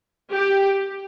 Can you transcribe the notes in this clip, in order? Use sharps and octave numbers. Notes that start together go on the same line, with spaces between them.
G4